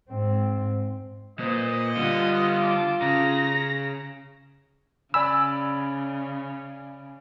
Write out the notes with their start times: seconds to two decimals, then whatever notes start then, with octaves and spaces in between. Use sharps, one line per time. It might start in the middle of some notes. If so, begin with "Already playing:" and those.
0.11 G#2 C4
1.39 A#2 B4 C5 D#5
1.97 D3 G3 F4 B4 F#5
2.60 A5 D6
3.02 C#3 A#5 A#6
5.14 C#3 D5 G#5 B5 E6